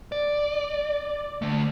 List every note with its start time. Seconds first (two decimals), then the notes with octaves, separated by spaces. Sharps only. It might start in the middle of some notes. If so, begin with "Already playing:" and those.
0.12 D5
1.42 D3 A3